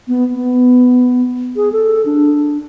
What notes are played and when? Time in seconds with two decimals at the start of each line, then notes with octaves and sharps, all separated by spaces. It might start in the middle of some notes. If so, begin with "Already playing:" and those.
0.08 B3
0.35 B3
1.56 G#4
1.72 A4
2.06 D4